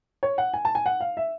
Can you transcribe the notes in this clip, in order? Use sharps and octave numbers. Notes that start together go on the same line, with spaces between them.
C#5
F#5
G#5
A5
G#5
F#5
F5
E5